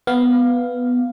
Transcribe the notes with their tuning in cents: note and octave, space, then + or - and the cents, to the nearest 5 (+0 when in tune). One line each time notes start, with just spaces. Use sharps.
B3 +0 F5 +0